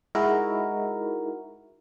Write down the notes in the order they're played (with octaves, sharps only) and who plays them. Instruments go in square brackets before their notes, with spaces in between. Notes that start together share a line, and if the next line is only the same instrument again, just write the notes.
[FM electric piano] G#3 D#4 E4 F#4 A#4